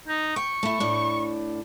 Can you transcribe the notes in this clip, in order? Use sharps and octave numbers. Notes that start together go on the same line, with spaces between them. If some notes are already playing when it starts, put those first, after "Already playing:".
D#4
G5 C#6
A3 E4
A2 D4